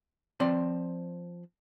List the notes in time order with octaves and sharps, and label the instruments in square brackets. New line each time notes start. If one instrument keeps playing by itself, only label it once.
[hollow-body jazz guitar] F3 C4 D5 C6